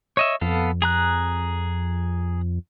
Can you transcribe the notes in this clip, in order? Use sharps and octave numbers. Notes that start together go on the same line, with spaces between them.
C#5 D#5 E5
F2 B3 A4 F5
G#4 A#5 F#6